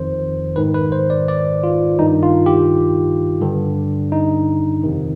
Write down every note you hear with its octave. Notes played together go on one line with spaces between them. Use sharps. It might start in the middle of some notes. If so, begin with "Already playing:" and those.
Already playing: F2 D#3 C5
G#2 D#3 B4
B4
C5
D5
D5
F4
G2 D#3 D#4
F4
G4
G2 D3
D#4
F2 C3 D#3